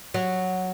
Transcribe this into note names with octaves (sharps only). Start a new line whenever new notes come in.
F#3